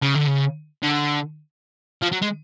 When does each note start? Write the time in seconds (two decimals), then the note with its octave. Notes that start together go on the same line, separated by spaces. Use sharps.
0.03 C#3
0.15 D3
0.28 C#3
0.83 D3
2.03 F3
2.13 F#3
2.22 G#3